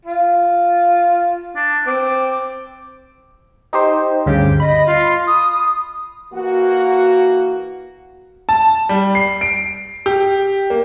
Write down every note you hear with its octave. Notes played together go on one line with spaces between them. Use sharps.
F4
D4
C4 D6
D#4 G4 C5
D2 G2 C#3 G4
D#5 B5
F4
D#6
E3 A#3 F#4
A5
G3
C7
D7
G4
A#3